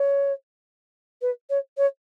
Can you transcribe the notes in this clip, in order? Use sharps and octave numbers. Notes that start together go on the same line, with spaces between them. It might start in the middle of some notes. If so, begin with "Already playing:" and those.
Already playing: C#5
B4
C#5
C#5